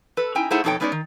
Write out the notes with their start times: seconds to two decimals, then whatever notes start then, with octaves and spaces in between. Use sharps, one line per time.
0.17 A4 B4
0.35 C#4 D#4 E4 G5 G#5
0.51 A3 D#4 E4 G#4 C5 F#5
0.64 F2 B2 D#4 A4 C#5 G5
0.80 G#3 B3 C#4 D#4 B4 D5
0.92 D#3